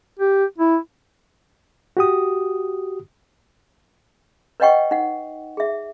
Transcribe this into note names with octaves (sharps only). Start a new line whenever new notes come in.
G4
E4
F#4 G4 D#6
B4 C#5 D#5 F#5 G5 C#6
D#4 F#5
G#4 E5